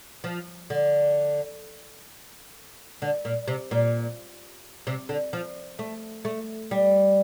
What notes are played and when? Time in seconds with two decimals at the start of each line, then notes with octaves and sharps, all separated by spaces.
0.24 F3
0.70 D3
3.02 D3
3.25 A#2
3.48 C3
3.71 A#2
4.87 C3
5.09 D3
5.33 F3
5.79 A3
6.25 A3
6.71 G3